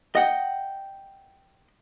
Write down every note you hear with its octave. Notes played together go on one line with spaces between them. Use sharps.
D#5 F#5 G5